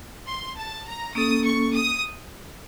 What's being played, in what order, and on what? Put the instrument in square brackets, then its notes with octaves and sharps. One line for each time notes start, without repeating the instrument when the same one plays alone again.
[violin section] C6
A5
A#5
[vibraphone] A#3 C#4 A4 [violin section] D#6
[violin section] C#6
D#6